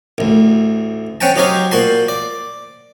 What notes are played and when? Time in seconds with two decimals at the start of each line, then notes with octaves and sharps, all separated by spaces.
0.18 A1 D2
1.21 C4 C#4 F#5 G5 A5
1.36 F#3 D#4 G4 C5 C#5 F5
1.71 A#2 F#4 C5 A5 C6
2.08 D5